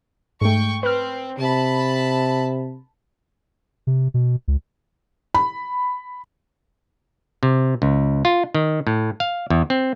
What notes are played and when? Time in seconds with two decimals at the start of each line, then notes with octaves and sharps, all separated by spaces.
0.41 G#2 A3 G5 C#6
0.83 C4 B4 F6
1.39 C3 A5 B5
3.87 C3
4.14 B2
4.48 C#2
5.34 B5
7.43 C3
7.82 C#2
8.25 F4
8.55 D#3
8.87 A2
9.20 F5
9.50 E2
9.70 C4